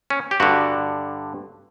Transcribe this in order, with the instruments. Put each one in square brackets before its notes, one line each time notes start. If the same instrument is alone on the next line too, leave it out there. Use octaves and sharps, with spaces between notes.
[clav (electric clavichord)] C#4
G4
G2 D3 F#4